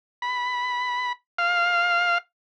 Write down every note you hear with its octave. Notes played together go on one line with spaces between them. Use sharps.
B5
F5